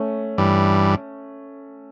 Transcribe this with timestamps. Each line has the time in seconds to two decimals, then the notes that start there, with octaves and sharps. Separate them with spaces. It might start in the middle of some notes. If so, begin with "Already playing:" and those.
Already playing: A3 C#4
0.38 G2 E3 G3